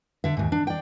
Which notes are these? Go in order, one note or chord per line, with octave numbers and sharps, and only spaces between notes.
D3 E5
D#2 G#2
D4
D5 G5